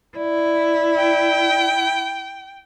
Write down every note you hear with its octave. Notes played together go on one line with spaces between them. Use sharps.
E4 D5
G5